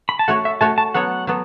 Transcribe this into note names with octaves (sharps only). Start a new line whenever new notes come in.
B5
A5
A3 F#4 C#5 F#5
E5
A3 F#4 C#5 A5
A5
F#3 B3 A4 C#5 F#5
F#3 B3 A4